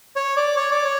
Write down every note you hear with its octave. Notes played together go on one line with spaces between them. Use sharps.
C#5
D5
C#5
D5
C#5